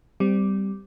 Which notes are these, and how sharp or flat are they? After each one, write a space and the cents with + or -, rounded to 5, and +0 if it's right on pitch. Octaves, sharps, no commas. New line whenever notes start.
G3 +0 C4 -20